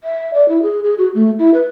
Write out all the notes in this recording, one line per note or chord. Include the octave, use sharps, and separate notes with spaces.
E5
D5
E4
G#4
G#4
F#4
A3
E4
B4